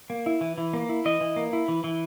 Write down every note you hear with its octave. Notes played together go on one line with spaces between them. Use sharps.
A#3
E4
E3
E3
A#3
E4
E3 D#5
E3
A#3
E4
E3
E3